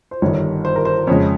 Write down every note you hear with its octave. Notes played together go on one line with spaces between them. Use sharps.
C5
G1 G2 D#3 C#5
C5
A#4
C5
F2 C#3 G#3 C#5